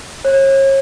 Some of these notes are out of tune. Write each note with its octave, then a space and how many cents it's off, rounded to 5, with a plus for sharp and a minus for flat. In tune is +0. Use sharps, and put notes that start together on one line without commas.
C#5 -40